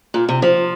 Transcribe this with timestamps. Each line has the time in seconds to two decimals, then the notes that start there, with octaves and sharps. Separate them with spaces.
0.14 A#2
0.29 C3
0.42 F3